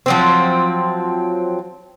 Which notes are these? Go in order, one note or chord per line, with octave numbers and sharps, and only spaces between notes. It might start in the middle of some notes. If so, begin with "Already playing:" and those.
F3 F#3 C4